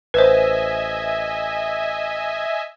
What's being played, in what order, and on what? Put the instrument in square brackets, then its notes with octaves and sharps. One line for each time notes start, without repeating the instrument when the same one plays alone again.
[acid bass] A1 [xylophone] B4 C5 [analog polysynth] D#5 E5 G#5